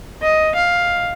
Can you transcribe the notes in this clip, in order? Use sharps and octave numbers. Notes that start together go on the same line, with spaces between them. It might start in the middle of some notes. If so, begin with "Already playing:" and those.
D#5
F5